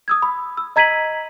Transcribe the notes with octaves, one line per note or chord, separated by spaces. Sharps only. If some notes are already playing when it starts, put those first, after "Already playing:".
D#6 E6 G#6
B5
E6
D#5 A#5 G#6 B6 D#7 F#7